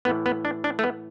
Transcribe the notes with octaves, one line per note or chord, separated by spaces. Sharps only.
A2 E3 B3
B3
D4
D4
A3
B3